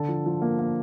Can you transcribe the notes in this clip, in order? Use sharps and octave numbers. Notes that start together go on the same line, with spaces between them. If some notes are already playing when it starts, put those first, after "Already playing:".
Already playing: D3 A4
F3
F3
A#3
A#3